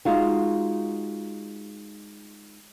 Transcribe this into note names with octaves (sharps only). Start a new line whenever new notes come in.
G#3 D#4 F4 F#4